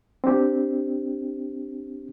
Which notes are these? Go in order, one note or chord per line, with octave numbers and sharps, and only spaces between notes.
C4 D4 G4